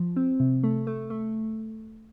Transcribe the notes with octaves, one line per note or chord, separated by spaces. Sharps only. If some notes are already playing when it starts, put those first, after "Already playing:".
Already playing: F3
C4
C3
A3
A3
A3